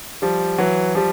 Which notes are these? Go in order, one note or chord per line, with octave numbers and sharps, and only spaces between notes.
F3 G3
E3 F#3
F3 G3